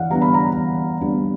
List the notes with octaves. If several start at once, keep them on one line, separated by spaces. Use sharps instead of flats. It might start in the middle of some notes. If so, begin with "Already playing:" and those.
Already playing: E3 F5 F#5
G3 B3 D4 A#5
B5
A#5
E3
G3 B3 D4